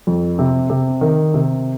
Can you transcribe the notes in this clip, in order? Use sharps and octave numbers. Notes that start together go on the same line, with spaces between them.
F2
C3
C3
D#3
C3